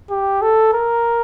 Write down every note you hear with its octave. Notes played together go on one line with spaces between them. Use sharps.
G4
A4
A#4